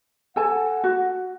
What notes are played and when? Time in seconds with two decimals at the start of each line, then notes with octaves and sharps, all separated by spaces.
0.36 A4 F#5 G#5 A5
0.84 F#4